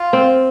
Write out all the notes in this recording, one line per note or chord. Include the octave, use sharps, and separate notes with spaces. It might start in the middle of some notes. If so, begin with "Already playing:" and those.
Already playing: F4
C4